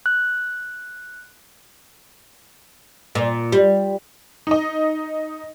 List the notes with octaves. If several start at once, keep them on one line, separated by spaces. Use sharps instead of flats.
F#6
A#2
G3
D#4 D#5